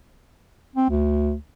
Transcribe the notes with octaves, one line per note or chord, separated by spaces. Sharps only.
C4
D2